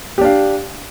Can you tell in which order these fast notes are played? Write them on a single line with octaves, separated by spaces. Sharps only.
G4 D4 F5